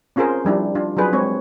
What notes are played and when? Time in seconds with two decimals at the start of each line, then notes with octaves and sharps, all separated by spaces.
0.16 C4 C#4 F4 G#4 A#4 C5
0.45 F3 G3 D4 E4
0.75 D4 F4
0.97 F#3 C4 D4 F4 G#4 B4
1.13 G#3 C4 C#5